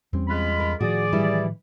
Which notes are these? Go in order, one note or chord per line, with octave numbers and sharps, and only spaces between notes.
E2 G3 C4 C#4
G#3 F4 B5
A#4
A2 D#3 F3 F#4 G#4 D5
E3 G3 E4